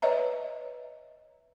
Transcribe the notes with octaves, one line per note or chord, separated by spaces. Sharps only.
B4 C#5 D#5 E5 A#5